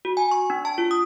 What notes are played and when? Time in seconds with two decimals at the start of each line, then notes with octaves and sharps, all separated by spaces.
0.05 F#4
0.17 G#5
0.31 C#6
0.50 D4
0.65 A5
0.78 F4
0.91 D#6